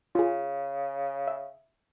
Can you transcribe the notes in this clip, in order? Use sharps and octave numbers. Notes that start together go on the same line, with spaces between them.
C#3 F4 G#4
E5